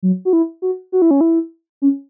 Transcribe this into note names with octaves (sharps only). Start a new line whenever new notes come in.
F#3
F#4
E4
F#4
F#4
E4
C#4
E4
C#4